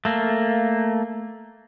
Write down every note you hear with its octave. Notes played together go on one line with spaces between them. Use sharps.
A3 A#3